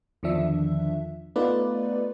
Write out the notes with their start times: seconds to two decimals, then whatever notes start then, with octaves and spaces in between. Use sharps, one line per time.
0.23 E2 D3 D#3 F3 D4 E5
1.36 A3 B3 D#4 F4 B4 D5